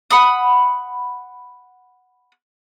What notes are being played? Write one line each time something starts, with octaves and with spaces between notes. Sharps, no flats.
F#5 B5 D#6